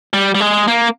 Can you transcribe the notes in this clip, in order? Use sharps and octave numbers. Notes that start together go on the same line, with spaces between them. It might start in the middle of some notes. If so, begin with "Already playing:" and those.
G3
G3
G#3
A#3